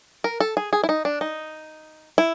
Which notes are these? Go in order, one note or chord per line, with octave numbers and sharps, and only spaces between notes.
A#4
A4
G#4
G#4
E4
D#4
D4
D#4
E4